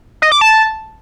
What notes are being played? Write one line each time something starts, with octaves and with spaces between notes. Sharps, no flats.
D#5
D6
A5